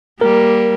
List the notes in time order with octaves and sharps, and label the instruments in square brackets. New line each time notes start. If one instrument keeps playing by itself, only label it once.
[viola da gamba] G3 A#3 [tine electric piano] A#4